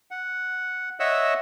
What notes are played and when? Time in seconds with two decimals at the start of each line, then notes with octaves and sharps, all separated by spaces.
0.11 F#5
1.00 C#5 D#5 E5 F#5 E6